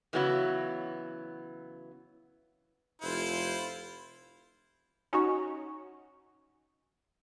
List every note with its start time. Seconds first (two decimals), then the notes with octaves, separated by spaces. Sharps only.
0.13 C#3 E3 F#3 B3 E4 F#4
3.02 F1 E4 F4 C5
5.13 C#4 D#4 F#4 C#5